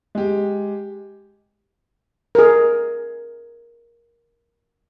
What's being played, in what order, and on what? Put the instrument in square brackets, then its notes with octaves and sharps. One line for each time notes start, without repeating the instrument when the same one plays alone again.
[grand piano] G#3 G4
[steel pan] G#4 A#4